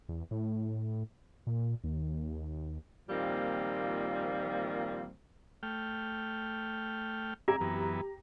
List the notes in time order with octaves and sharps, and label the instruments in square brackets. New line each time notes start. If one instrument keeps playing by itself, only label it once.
[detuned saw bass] E2
A2
A#2
D#2
[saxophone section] A#2 D#3 F3 G3 A#3 C4
[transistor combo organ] A3 G5 F6
[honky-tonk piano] G4 A#5 [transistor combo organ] D5 E5 G#5
[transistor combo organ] F#2 E3 B3